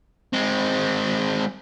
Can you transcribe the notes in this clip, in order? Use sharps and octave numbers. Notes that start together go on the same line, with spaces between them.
G#3 C4